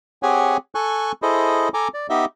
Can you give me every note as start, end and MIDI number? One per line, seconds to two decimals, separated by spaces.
0.23 0.57 60
0.23 0.57 67
0.23 0.57 68
0.23 0.57 73
0.23 0.57 78
0.23 0.57 80
0.75 1.12 69
0.75 1.12 80
0.75 1.12 85
0.75 1.12 90
1.22 1.69 64
1.22 1.69 68
1.22 1.69 69
1.22 1.69 72
1.22 1.69 75
1.74 1.88 69
1.74 1.88 80
1.74 1.88 82
1.74 1.88 86
1.94 2.07 74
2.10 2.25 59
2.10 2.25 63
2.10 2.25 67
2.10 2.25 75
2.10 2.25 76